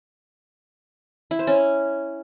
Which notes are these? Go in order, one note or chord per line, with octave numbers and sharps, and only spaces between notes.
E4
C5
C#4